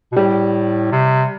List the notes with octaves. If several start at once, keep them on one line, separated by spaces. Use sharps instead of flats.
B2
A2 G3
C3